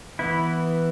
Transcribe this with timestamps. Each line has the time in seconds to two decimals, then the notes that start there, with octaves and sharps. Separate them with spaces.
0.19 E3 B3 E4